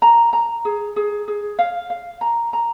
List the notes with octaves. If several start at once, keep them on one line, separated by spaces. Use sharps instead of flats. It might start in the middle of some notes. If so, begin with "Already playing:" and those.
A#5
A#5
G#4
G#4
G#4
F5
F5
A#5
A#5